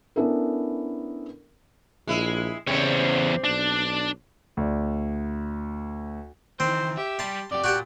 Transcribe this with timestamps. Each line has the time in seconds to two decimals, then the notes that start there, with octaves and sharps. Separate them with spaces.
0.16 B3 C#4 D4 E4 A4 A#4
2.08 A#1 G#3 E4
2.67 E2 C#3 G3 C4 C#5
3.44 B1 D4
4.57 D2 D5
6.60 D#3 E3 C4 C5
6.98 G4 E5
7.19 G3 A5 C6
7.51 F2 G4 D5
7.64 A#2 F#4 G4 F#5